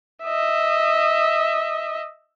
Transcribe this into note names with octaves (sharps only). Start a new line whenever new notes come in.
D#5 E5